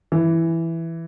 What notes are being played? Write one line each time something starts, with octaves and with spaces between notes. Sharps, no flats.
E3